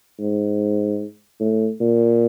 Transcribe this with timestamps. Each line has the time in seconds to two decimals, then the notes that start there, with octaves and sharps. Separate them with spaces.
0.19 G#2
1.40 A2
1.80 A#2